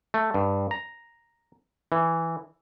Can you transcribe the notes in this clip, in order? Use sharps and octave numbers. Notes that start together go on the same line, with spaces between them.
A3
G2
A#5
E3